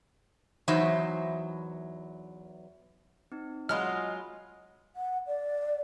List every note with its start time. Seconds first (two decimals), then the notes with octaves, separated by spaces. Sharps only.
0.68 E2 E3 F#3 D#4 C5 E5
3.32 C4 D#4
3.69 F#3 G#3 F4 D#5 F#5 G#5 B5 F6
4.96 F#5
5.27 D5